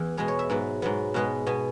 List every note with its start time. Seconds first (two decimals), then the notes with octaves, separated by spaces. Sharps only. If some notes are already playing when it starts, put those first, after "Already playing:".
Already playing: E2 E3
0.17 B2 G#3 B3 G#4
0.28 C#5
0.39 E5
0.50 G#2 F#3 B3
0.82 G#2 F#3 B3
1.14 B2 G#3 B3 F#5
1.47 B2 B3 G#5